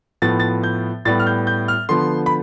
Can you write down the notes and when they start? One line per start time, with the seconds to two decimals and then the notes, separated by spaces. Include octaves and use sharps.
0.22 A2 F3 B3 A6
0.40 A6
0.64 G6
1.05 A2 G3 B3 A6
1.19 F6
1.27 G6
1.47 G6
1.68 F6
1.89 D3 F3 B3 C6
2.26 B5